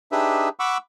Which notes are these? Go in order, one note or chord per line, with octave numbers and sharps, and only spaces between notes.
D4 D#4 G4 G#4 B4 E5
F#5 B5 C#6 D6 E6